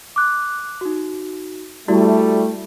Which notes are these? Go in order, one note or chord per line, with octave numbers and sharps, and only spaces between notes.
D6 F#6
D#4 F#4
G3 A3 E4 F#4 D5